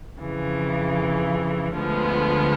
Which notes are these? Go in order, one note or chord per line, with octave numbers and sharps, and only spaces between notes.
F2 C#3 E3
D2 D3 F3 G#3 B3